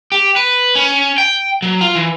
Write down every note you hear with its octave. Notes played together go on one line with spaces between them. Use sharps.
G4
B4
C#4
G5
F#3
F4
E3